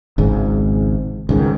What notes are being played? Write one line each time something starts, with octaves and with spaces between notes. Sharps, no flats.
G#1 C#2 G#2
C#2 G#2 D#3